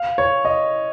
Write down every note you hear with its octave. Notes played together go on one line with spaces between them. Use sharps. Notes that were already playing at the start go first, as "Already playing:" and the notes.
Already playing: F5
C#5
D#5